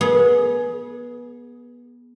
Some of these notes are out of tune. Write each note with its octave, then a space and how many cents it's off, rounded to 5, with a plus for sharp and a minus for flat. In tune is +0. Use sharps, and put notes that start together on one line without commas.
B3 -25 G#4 +15